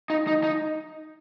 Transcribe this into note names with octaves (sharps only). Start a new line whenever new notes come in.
D#4
D#4
D#4